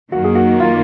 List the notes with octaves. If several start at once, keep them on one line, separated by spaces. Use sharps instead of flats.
F#2 D#3 F#3 A#3 F#4
G#4
F#4
F4